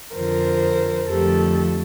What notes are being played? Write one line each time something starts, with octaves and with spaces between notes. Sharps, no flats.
F2 D3 F3 A#4 C5
F2 D3 F3 A3 G4 A4